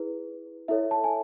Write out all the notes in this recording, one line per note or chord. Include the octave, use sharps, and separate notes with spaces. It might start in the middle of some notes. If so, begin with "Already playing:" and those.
Already playing: E4 G#4 B4
E4 A4 C#5 E5
A5
G#5